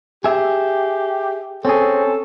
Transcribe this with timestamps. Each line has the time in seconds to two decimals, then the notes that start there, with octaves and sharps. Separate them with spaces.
0.24 G4 G#4 E5
1.65 C4 C#4 G#4 A4